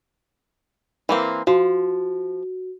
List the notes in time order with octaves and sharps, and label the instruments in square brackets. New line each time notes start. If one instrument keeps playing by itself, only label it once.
[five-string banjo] E3 A#3 C4
[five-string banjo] F3 [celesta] F#4